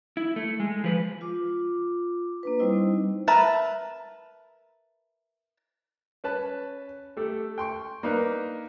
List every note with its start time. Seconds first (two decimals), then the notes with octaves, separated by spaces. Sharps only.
0.17 E4
0.36 A3
0.60 G#3
0.84 F3 B4
1.21 F4 D6
2.43 A#3 D4 B4
2.59 G3 C4 D#4 E4 C5 D#5
3.28 A#4 B4 E5 A5
6.24 C#4 B4 A5
7.17 A3 G4 A4
7.58 G5 C6 C#6
8.03 A#3 D4 D#4 A#4 B4